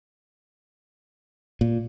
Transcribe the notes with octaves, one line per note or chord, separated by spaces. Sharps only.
A#2